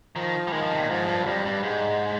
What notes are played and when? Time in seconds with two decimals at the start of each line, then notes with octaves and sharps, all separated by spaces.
0.16 D#3 F3
0.47 G3
0.52 D#3 G#3
0.62 F3
0.71 C3
0.80 A#2
0.90 G#2 F3
1.08 G2
1.26 F2 G3
1.45 G2
1.63 G#2 G#3